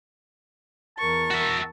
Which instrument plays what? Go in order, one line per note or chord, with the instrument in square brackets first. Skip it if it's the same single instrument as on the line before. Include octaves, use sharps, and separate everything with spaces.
[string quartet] E2 A#4 C#6 [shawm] A5
[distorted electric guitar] F#4 E5